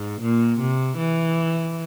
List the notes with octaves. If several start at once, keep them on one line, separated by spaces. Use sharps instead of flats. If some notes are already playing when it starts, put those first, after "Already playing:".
Already playing: G#2
A#2
C3
E3